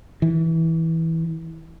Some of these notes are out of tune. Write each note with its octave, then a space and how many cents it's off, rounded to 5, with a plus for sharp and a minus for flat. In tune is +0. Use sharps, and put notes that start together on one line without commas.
E3 -20